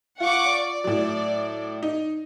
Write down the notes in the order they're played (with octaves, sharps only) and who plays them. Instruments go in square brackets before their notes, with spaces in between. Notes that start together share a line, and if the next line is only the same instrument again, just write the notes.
[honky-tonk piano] F4 [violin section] F#5 C#6 D6
[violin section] D5
[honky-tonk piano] A2 F#3
D#4